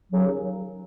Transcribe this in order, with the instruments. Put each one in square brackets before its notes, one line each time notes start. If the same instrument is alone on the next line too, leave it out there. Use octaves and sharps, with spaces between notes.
[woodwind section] D#2 C#3 F#3